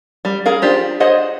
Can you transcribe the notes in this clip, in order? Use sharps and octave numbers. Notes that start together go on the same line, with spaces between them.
G3
G#4 A#4 F5
D4 F4 G4 C5
G#4 C5 D#5 F#5